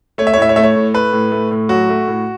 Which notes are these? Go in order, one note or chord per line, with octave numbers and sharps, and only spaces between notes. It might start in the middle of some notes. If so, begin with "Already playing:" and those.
A3 C#5
E5
C#5
A2
E5
C#5
A3 E5
C#5
A2
A3 B4
A2
A3
A2
F#3 F#4
A3
A2